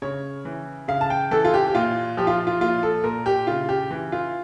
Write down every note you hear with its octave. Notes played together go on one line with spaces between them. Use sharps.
C#3 C#5
E3
C#3 F5
A5
G5
E3 A4
F4
G4
G4
A#2 F4
F3 G4
F4
F4
A#2 F4
A4
A#2 A#4
G4
C#3 F4
G4
E3
F4